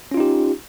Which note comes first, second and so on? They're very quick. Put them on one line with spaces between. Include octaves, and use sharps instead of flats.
C#4 F4 D#4 G4